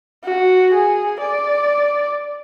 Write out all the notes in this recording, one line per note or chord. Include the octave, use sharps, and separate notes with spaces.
F#4
G#4
D5